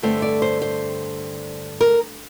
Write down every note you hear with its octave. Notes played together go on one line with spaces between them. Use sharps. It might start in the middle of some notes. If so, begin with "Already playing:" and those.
G2 D3 A3 C4 C5
D5
C5
C5
A#4